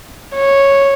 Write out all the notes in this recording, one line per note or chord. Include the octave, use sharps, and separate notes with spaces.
C#5